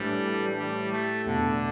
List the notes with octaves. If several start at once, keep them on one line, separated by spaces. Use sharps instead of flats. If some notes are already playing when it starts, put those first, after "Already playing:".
Already playing: A2 E3 G3 A3 D4 A4
A2 G3 A3 G4
A3
E2 B2 D3 A3 D4 A4